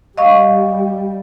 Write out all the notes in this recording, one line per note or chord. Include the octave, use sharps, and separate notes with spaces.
G3 D#5 F5 C#6